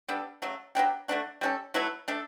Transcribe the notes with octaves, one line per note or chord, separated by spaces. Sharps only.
G3 B3 D4 A4
C#3 F#3 A3
F#3 B3 D4 G4
D3 A3 D4 F#4
G3 C#4 F#4 A4
F#3 A3 E4 B4
A3 D4 A4